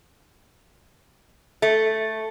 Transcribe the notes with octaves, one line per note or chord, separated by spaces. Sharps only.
A3